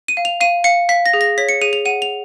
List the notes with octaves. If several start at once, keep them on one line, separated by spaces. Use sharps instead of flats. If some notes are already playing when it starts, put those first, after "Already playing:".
D#7
F5
F7
F5 D#7
F5 C#7
F5 B6
A#6
G#4
A#6
C#5 B6
C#7
G#4 D#7
F7
F#5 D#7
F7